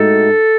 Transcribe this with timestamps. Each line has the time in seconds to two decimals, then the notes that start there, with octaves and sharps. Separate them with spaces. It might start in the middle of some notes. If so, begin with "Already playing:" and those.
Already playing: A2 G#3 D#4 F#4 A4